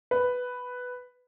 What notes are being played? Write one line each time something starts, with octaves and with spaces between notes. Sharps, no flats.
B4